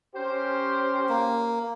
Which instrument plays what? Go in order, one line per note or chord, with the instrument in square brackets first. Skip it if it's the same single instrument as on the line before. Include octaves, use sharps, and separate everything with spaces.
[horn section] C#4 A#4 C5 [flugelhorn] G4
[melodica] A#3